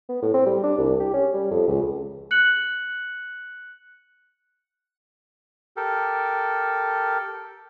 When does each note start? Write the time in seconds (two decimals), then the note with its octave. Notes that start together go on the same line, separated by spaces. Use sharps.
0.09 B3
0.22 A2
0.34 C4
0.46 G3
0.63 D4
0.78 C2
1.00 G4
1.14 C#4
1.34 G3
1.51 F2
1.67 C#2
2.31 F#6 C#7 F#7
5.77 G4 A4 A#4